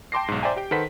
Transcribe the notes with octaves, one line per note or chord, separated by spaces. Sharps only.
G5 A5 C6 D6 A#6 C7
B1 G#2
C5 D5 E5 G5 G#5 A#5
G4 G5
D#3 A4 B4 C5 F#5 B6